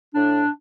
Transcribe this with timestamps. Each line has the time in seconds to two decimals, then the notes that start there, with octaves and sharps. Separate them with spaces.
0.14 A2 D4